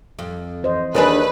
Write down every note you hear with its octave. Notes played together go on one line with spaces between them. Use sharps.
F2
E3 C5 D#5
D#2 D#3 D4 G#4 B4